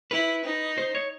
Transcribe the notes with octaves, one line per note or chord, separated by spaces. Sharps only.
E4 B4
D#4
C5
C#5